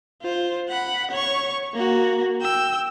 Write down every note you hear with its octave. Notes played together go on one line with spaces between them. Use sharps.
F4 C5
F#5 B5
C#5 C#6
A#3 F#4
G5 E6